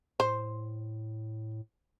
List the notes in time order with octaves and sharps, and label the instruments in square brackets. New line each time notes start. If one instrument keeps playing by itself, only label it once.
[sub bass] A2 [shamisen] C5